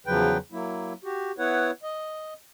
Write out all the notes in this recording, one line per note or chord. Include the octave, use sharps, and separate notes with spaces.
E2 C#3 F3 F#3 B4 G5
F#3 A#3 E4
F#4 G4
B3 E4 B4 C#5 F#5
D#5